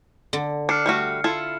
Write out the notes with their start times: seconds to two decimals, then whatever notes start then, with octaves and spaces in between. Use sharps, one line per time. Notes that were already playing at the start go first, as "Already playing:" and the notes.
0.33 D3
0.69 D4 F6 C7 C#7
0.86 G3 A3 F#4
1.24 E4 F4 A4